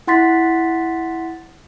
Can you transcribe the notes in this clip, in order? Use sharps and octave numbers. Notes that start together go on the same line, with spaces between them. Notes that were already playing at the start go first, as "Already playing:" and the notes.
E4 F#5 C6 A6 B6